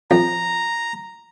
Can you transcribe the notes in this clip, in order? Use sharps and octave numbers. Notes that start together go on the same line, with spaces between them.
F2 A#5